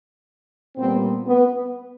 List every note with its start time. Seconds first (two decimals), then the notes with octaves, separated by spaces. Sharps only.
0.76 A#2 G3 B3 C4
1.28 B3